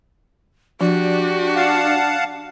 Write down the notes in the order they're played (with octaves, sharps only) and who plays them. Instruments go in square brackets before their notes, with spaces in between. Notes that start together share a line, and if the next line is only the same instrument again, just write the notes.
[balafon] F3 [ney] D4 [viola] F#4 G4
[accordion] F5 F#5 A5